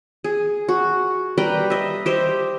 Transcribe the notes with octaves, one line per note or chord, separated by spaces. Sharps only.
G#4
F#4
G3 B4 G5 A#5
D#5 E5
G4 C5 D#5 E5